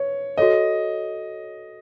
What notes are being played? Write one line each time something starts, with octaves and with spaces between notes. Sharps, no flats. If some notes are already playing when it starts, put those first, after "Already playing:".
Already playing: C#5
F#4 A4 C#5 D#5